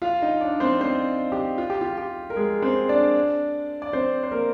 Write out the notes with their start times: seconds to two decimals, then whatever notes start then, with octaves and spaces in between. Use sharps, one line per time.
0.02 F4 F5
0.22 D#4 D#5
0.41 D4 D5
0.60 C4 C5
0.81 C4 C5
1.32 G4
1.58 F4
1.70 G4
1.81 F4
1.98 G4
2.30 A#4
2.36 G#3 G#4
2.62 C4 C5
2.89 D4 D5
3.82 D5
3.93 C4 C5
4.23 C5
4.32 A#3 A#4